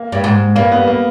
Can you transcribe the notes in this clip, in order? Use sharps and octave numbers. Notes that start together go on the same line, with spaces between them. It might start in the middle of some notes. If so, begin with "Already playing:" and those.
Already playing: A#3
G2
G#2
G2 A#3
B3
A#3